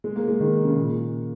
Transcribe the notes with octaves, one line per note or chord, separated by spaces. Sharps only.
G#3
A#3
G#3
D#3
C#3
A#2